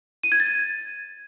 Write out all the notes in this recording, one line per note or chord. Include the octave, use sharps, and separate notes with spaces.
D#7
G#6
A6